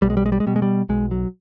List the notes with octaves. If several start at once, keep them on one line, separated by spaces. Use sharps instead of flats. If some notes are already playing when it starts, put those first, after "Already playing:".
B1 G3
G#3
G3
G#3
G3
G#3
B2 G3
G#3
G3
B1 G#3
F#3